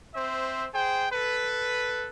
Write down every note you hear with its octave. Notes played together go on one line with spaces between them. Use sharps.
C4 C5 E5
G#4 C5 G5
A4 B4